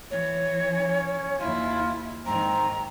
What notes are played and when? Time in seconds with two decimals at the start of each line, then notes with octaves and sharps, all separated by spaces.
0.11 E3 C#5
0.71 C#4
1.40 D#2 E4 F4
2.26 G#2 D#3 C4 A#5